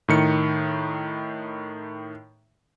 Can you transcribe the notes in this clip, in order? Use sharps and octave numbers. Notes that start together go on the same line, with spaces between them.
A2 D#3 C#7